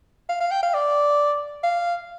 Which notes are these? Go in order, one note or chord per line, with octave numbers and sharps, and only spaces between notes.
F5
F5
G5
F5
D5
F5